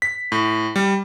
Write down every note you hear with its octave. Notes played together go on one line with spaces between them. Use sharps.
B6
A2
G3